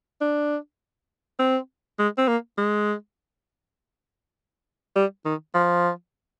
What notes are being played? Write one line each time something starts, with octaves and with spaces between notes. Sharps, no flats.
D4
C4
G#3
C4
A#3
G#3
G3
D#3
F3